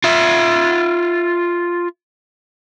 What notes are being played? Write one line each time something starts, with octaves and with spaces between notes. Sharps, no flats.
F4 E5